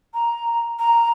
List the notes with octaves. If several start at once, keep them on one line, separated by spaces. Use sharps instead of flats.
A#5
A#5